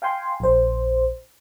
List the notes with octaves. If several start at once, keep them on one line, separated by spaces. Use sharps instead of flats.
F5 G5 G#5 C6
A#1 C5